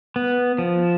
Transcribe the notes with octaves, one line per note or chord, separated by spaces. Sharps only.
B3
F3